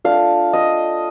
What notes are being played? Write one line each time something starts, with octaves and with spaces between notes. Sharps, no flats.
A3 D4 F4 F5
D#5